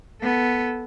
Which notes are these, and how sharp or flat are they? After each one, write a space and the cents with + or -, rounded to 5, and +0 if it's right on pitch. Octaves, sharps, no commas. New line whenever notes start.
B3 -5 A4 +0